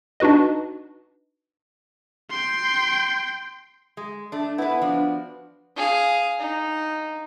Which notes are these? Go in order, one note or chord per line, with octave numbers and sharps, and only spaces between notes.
D4 D#4 F#4 B4 D#5
G5 C6
G#3
A3 D4
B3 E4 B4
F3 D4 F#4
G#4 F5
D#4